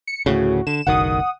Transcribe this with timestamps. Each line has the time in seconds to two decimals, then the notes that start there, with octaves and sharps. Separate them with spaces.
0.07 C#7
0.26 D2 A2 C#3 F#4
0.67 D3 E7
0.87 F#1 B1 D#3 F#5 D#6